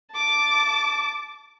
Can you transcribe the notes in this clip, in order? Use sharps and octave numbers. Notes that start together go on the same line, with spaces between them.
A5 D6